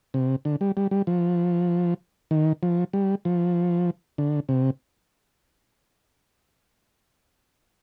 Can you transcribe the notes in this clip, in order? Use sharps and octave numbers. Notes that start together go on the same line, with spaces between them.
C3
D3
G3
G3
G3
F3
D#3
F3
G3
F3
D3
C3